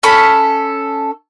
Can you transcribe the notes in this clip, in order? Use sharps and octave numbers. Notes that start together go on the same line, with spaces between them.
C#4 A4 B5